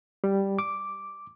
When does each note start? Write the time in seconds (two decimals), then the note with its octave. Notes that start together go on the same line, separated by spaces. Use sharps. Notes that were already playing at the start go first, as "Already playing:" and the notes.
0.24 G3
0.59 D6